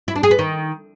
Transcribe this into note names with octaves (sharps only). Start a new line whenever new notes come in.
E4
D4
G#4
B3
D#3